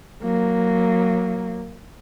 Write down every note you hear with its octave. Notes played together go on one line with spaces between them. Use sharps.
F#3 A#3